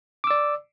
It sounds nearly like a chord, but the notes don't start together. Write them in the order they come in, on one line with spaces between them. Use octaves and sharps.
D6 E6 D5